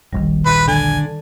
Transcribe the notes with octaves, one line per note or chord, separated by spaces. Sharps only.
E1 A#1 D#3 G3
D#1 A#1 B4 C6
D3 G#5